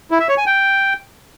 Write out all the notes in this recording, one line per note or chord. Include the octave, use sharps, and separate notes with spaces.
E4
E5
C#5
G#5
G5